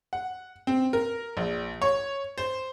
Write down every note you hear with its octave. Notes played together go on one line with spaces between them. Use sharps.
F#5
C4
A#4
A#1
C#5
C5